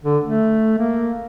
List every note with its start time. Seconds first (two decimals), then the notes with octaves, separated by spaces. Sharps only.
0.04 D3
0.23 A3
0.78 A#3